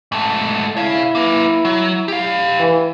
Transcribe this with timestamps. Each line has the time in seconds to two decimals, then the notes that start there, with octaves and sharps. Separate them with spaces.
0.12 G#2 A3
0.77 E4 C#5 F5
1.15 A#3 B4
1.65 F#3
2.08 G4 F5
2.59 E3